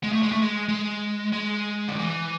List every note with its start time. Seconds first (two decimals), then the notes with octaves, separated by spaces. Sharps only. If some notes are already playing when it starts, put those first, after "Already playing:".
0.03 G#3
0.12 A3
0.23 G#3
0.32 A3
0.42 G#3
0.69 G#3
1.33 G#3
1.88 D3
1.99 E3